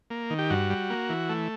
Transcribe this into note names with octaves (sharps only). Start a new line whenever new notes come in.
A#3
D#3
G4
G2 F#4
G3
A#3
E3
A3